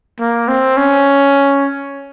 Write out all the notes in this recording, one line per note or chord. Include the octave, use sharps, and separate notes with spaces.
A#3
C4
C#4